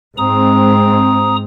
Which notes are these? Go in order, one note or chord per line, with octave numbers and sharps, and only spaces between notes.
G#2 G#3 C4 A#5 D#6